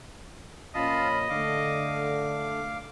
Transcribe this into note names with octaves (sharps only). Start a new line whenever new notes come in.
A#2 F3 C#4 F4 D#5 F5 A5 B5
D3 A3 F5 D6